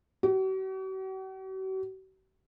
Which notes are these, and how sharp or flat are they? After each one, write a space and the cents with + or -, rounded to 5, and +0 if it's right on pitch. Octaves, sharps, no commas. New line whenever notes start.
F#4 +45